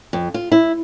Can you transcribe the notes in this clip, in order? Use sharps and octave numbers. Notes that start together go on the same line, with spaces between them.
F2
F4
E4